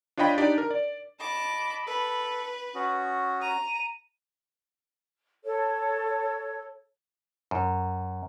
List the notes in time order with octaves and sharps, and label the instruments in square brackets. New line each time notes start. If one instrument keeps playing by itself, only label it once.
[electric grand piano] D4 F4 C#5 D#5 G5 B5
D4 D#4 G4 D5
A#4
D5
[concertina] D#5 [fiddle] A5 D6 [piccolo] B5
[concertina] A4 [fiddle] B4
[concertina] C#4 F#4 [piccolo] D#6
[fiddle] A#5 [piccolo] D#7
[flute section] A4 C#5
[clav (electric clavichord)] F#2